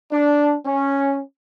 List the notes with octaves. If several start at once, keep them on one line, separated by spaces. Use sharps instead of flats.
D4
C#4